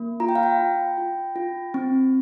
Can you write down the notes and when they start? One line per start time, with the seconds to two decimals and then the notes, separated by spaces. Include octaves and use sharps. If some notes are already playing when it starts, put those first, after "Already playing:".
Already playing: A#3
0.20 F4 A#5
0.29 G5
0.35 F5
0.43 G5
0.59 F4
0.98 F4
1.36 F4
1.74 C4